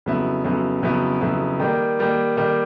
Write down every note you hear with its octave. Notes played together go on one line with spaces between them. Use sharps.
F2 C#3 F#3 B3 E4
F2 C#3 F#3 B3 E4
F2 C#3 F#3 B3 E4
F2 C#3 F#3 B3 E4
D#3 G3 A#3
D#3 G3 A#3
D#3 G3 A#3